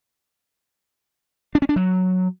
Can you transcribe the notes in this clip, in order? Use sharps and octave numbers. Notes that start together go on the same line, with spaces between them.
D4
C#4
D4
F#3